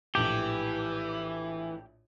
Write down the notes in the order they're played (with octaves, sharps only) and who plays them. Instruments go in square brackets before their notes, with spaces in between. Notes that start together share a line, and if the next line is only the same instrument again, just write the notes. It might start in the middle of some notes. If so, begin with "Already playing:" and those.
[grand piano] A#1 A2 A5 [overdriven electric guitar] E3 [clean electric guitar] G4